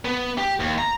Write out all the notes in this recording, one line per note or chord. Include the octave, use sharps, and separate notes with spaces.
B3
G4
D#2
A#5